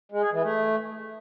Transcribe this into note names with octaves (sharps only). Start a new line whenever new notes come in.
G#3
G#4
E3
A3